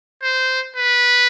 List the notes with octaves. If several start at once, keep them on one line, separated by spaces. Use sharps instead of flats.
C5
B4